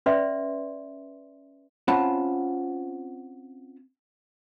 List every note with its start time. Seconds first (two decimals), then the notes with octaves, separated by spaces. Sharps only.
0.06 C#4 B4 D5 E5 C6
1.88 C4 C#4 F4 F#5 A5 B5